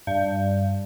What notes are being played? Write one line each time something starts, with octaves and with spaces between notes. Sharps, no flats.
G2